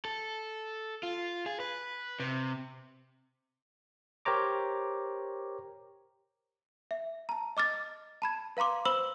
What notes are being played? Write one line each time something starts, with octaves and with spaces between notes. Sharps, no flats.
A4
F4
G#4
B4
C3
G4 A#4 C5 C#5 A#5 D6
E5
A5 A#5
D#5 D6 F6 A6
A5 B5 G#6
B4 F5 A#5 C6 D6
C5 B5 E6 F#7